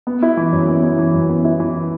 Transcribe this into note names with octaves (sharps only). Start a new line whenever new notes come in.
B3
E4
E3
F#2
B3
E4
E3
F#2
B3
E4
E3